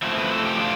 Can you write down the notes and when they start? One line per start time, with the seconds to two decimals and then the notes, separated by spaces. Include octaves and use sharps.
0.02 A2 F3 A3 C4 E4
0.18 B4
0.31 A4
0.45 G4
0.59 D4 F4